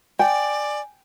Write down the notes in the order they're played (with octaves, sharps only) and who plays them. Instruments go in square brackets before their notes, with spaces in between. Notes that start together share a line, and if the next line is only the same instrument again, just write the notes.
[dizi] D5 [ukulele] G5 [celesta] G#5